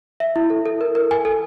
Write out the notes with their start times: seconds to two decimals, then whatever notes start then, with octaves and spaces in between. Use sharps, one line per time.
0.20 E5
0.36 E4
0.50 A4
0.66 A4
0.81 A#4
0.95 A#4
1.11 G#5
1.25 A4